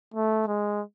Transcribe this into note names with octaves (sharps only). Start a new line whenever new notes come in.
A3
G#3